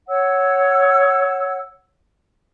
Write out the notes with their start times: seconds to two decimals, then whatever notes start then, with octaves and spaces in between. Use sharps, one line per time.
0.08 C#5 F#5 E6